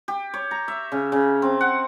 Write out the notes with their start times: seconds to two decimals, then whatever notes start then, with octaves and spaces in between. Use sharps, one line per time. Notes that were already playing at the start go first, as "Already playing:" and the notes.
0.08 G4
0.34 C#5
0.51 A#5
0.68 E5
0.92 C#3
1.12 C#3
1.42 C4
1.61 F#5